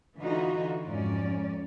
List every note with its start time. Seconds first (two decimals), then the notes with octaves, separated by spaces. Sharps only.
0.18 D3 E3 D#4 F4 F#4
0.86 F2 G#2 C#4 D5